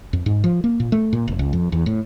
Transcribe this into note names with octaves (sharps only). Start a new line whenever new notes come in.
F2
G#2
F3
A#3
A#2
A3
A#2
F1
C#2
F2
E2
A2